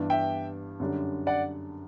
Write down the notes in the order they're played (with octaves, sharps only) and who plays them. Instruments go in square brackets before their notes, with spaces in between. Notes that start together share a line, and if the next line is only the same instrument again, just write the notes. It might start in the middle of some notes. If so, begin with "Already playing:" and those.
Already playing: [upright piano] G2 E3 B3 D4
[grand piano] E5 G5
[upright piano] F#2 D3 G3 D4
[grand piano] D5 F#5